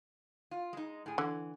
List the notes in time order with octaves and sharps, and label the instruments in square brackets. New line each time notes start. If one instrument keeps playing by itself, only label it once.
[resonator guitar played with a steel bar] F4
G#3 D#4
A2 G#4
[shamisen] D3 [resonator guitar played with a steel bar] E3